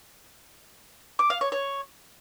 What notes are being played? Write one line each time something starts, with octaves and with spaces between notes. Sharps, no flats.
D6
F5
C#5
C#5